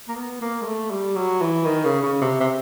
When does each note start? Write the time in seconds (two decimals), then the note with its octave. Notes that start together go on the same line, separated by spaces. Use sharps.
0.08 A#3
0.16 B3
0.41 A#3
0.62 G#3
0.66 A3
0.91 G3
1.16 F#3
1.41 E3
1.65 D#3
1.85 C#3
2.03 C#3
2.21 C3
2.40 C3